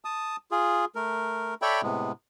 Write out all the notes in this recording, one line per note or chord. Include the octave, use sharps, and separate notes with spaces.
A5 D#6
F4 G#4
A3 A#4
A4 C#5 D5 E5 G5 B5
A2 C3 G#3 B3